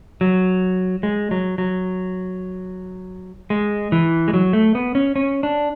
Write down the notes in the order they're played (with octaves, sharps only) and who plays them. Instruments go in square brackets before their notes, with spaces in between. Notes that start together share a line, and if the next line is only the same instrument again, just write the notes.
[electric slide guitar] F#3
G#3
F#3
F#3
G#3
E3
G#3
F#3
A3
B3
C#4
C#4
D4